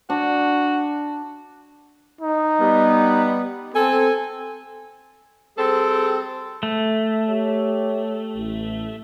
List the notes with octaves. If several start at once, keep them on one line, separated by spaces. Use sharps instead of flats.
D4 F#4
D#4
G3 B3
C4 A4 G#5
G3 C4 G#4 A4
A3
G4 C#5
A1